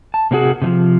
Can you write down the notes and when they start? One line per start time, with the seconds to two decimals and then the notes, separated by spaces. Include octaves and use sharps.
0.14 A5
0.31 C3 A#3 C4 F#4 G#4 A#4
0.62 C3 E3 F3